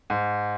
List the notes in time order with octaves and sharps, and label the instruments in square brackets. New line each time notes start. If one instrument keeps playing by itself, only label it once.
[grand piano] G#2